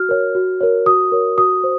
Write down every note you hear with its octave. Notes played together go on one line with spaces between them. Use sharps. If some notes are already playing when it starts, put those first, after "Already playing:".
Already playing: F#4 F6
A#4 C#5
F#4
A#4 C#5
F#4 D#6
A#4 C#5
F#4 D#6
C5